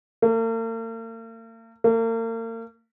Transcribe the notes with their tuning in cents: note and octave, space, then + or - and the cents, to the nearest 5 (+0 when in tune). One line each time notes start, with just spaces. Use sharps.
A#3 -45
A#3 -40